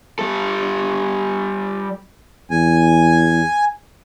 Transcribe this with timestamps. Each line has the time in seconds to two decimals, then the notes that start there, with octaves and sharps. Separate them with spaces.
0.19 G3 A4
2.51 E2 G#5